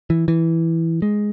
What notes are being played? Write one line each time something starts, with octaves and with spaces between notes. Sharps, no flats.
E3
E3
G#3